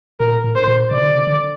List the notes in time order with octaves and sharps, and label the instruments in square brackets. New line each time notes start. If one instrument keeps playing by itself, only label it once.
[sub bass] A#2 [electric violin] A#4
[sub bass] A2
[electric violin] C5
[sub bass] A#2
[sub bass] C3 [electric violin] D5
[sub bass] D3
C3
D3